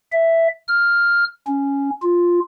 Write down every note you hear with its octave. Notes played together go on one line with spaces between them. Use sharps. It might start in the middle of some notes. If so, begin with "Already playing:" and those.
E5
F6
C#4
F4